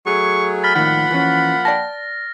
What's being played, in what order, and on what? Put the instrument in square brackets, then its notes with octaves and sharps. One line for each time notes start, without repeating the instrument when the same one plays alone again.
[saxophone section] F#3 A3 G#4 [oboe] C#6
[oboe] B5 [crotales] F6 A6
[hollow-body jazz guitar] A2 D#3 [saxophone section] F3 A#3 F#5 [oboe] B5
[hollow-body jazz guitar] E3 C#4
[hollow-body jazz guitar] D5 G5 A5 [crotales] A#6